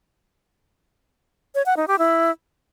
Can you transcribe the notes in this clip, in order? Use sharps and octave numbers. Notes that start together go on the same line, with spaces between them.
C#5
F#5
D#4
G4
E4